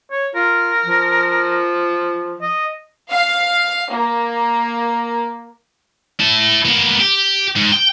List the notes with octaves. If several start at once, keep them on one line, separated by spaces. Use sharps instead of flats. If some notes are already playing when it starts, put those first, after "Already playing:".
C#5
F4 A#4
F3
D#5
F5
A#3
E4 A5
A#3 B3
G4
G#2
G5